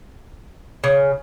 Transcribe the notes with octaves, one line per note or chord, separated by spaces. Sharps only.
C#3